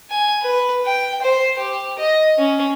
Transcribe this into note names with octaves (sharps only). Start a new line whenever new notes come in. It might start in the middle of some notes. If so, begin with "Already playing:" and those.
G#5
B4
G5
C5
G4
D#5
C#4